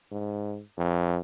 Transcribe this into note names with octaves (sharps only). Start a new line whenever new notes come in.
G#2
F2